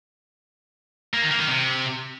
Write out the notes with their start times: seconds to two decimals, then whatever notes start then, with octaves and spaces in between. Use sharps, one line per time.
1.14 A#3
1.22 D#3
1.31 A#3
1.39 D#3
1.48 C3